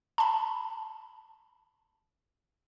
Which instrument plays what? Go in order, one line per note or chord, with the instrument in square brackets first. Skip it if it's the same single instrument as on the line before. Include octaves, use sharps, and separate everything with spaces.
[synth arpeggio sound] A5 B5